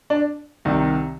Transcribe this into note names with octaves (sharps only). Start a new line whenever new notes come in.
D4
C2 C3 D#3